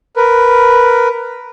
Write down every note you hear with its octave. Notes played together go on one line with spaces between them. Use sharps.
A#4 B4